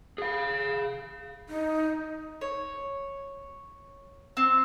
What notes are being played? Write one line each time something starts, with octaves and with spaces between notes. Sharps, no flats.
G#4 F5
D#4
C#5
C4